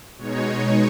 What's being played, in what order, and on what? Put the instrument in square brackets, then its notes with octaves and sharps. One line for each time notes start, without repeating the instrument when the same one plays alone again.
[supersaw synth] B2 G#3 D#4 C#5